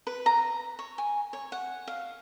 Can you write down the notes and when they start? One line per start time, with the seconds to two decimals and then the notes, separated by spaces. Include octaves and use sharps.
0.07 B4
0.26 A#5
0.79 C#5
0.98 G#5
1.33 C#5
1.52 F#5
1.87 F5